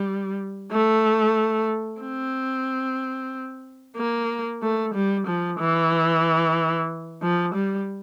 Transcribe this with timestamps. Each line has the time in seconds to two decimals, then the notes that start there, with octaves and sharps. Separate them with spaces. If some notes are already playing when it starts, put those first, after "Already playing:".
Already playing: G3
0.72 A3
2.01 C4
3.97 A#3
4.62 A3
4.94 G3
5.27 F3
5.59 E3
7.22 F3
7.55 G3